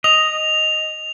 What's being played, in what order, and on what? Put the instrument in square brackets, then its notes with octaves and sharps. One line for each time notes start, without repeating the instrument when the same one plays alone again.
[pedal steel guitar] D#5 [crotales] F7